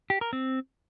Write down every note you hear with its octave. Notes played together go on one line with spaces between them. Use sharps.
G4
A#4
C4